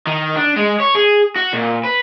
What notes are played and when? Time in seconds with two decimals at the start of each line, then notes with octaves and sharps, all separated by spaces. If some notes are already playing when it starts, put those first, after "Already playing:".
0.07 D#3
0.36 D4
0.56 G#3
0.80 C#5
0.95 G#4
1.36 F#4
1.53 A#2
1.83 B4